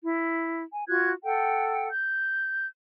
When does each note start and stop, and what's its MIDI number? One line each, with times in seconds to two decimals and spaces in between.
0.04 0.63 64
0.73 0.85 80
0.89 1.11 65
0.89 1.11 66
0.89 1.11 90
0.89 1.11 92
1.24 1.89 69
1.24 1.89 78
1.24 1.89 79
1.91 2.67 91